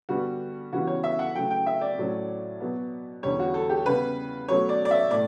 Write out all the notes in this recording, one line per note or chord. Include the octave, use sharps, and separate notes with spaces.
G2 D3 G3 B3 F#4
C#3 E3 G3 B3 F#4
C#5
E5
F#5
C#3 F#3 A3 G5
G5
E5
D5
A2 F#3 C#4
B2 F#3 B3
E2 D3 G3 C#4 C#5
F#4
A4
G4
C#3 G3 B3 B4
B2 F#3 A3 C#4 C#5
D5
D5
E5
A2 D5